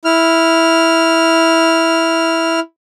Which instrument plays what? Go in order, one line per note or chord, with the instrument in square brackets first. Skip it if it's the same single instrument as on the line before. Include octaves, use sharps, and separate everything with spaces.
[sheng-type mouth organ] E4 F6